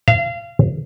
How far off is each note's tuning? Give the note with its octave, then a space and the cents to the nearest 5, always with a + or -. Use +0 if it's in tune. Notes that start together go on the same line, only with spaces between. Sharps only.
F5 -30